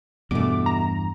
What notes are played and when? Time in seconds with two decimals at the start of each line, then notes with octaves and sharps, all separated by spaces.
0.31 E2 G2 B2 E3 A3 D6
0.66 A#5